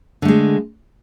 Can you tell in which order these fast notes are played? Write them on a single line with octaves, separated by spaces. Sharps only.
D3 A3 G#3